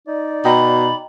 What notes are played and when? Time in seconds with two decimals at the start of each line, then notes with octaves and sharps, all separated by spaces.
0.07 D#4 D5
0.45 B2 D#5 G5 A#5 B5